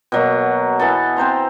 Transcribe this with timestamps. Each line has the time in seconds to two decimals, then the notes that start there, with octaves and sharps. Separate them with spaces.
0.12 B2 F#3 A#3
0.79 E3 B3 A4
1.16 C4 C5 A#5 C6